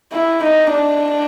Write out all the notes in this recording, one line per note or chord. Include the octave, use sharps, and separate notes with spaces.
E4
D#4
D4